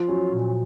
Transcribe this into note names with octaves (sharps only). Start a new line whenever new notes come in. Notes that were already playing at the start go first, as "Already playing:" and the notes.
Already playing: F3 F4
F#3 C#4
A#2